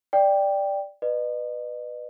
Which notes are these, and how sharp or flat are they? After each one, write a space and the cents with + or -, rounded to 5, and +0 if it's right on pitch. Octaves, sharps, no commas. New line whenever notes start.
D5 +0 G5 +5
B4 +0 D#5 -40